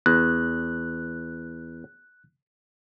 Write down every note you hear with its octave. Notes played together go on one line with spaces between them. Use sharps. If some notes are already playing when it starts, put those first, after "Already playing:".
E2 F#6